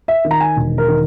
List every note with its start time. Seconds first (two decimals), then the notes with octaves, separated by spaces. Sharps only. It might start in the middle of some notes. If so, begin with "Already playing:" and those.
0.08 E5
0.25 D#3
0.31 A#5
0.40 G#5
0.57 E1
0.78 A#4
0.88 D#3